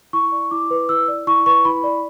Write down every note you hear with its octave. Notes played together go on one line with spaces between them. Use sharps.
E4 C#6
D5
E4 D6
B4
E4 E6
D5
E4 C#6
B4 C#6
E4 B5
D5